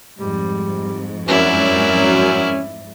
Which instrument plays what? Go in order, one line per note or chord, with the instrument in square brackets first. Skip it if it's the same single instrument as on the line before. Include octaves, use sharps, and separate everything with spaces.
[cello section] F2 G#2 [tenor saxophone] G3
[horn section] F#2 [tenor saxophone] C#4 [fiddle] E4 D5